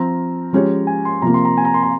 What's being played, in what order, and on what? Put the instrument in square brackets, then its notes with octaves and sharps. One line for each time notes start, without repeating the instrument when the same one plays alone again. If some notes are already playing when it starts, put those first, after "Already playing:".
Already playing: [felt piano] F3 C4 F4 [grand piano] A#5
[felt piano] F3 G#3 C#4 G4 C#5
[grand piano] G#5
C6
[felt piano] C3 F3 A#3 [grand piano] A#5
[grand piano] C6
A#5
G#5
A#5
C6
A#5